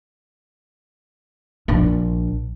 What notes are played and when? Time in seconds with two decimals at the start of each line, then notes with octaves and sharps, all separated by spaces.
1.68 A#1 D4